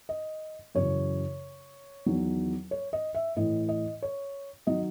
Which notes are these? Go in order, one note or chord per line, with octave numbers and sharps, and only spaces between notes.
D#5
F#2 C#3 E3 C#5
E2 D#3 F#3
C#5
D#5
E5
A2 E3 D#5
D#5
C#5
D#3 F#3 D#5